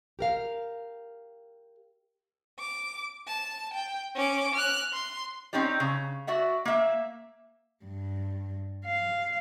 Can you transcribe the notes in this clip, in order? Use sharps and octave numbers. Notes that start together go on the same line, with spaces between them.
G4 A#4 F5
D6
A5
G5
C#4 D6
F6 F#6
C6
C4 C#4 D#4 G4 D5
C#3
F#4 D5 E5 F#5
A#3 E5
G2
F5